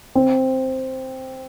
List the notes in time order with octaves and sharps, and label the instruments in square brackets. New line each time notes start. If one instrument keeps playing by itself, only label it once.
[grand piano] C4